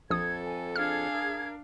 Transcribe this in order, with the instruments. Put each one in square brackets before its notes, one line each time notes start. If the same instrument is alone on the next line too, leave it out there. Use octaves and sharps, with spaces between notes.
[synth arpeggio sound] A#1 D#6 [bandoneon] F2 A4 [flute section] G#6
[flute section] G#5
[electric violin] D4 F5 [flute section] G#4 G#6 [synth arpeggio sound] F6
[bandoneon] A#4